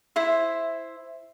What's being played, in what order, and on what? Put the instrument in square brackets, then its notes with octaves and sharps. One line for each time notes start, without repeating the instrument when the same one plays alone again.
[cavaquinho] E4 C5 E5